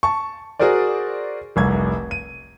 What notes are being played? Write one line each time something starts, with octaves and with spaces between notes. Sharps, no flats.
A5 C#6
F#4 G#4 A#4 C5 D5
F1 C2 G#6
D#7